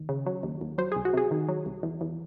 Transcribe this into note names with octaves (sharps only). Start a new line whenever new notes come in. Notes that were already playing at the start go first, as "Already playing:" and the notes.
Already playing: D#2
C#3
F#3
D#2
D#2
F#3 C5
C2 G#4
F#4
C3 G#4
D#3
F#3
C2
E2
E2